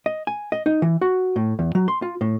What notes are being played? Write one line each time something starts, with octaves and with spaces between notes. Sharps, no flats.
D#5
G#5
D#5
D#4
E3
F#4
A2
E2
F#3
C6
F4
A2